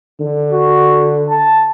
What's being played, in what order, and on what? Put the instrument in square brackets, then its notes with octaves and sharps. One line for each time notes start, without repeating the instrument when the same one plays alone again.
[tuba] D3
[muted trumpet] F#4
A5